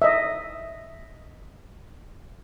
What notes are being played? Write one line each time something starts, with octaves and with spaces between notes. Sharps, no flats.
D#5 E5